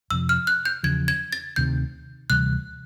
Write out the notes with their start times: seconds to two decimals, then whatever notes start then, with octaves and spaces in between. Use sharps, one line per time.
0.10 F2 C3 F3 E6
0.29 F6
0.47 F#6
0.65 G6
0.83 E2 C#3 F3 G#6
1.08 G#6
1.32 A6
1.56 D2 C3 D#3 G6
2.30 D2 C3 E3 G3 F#6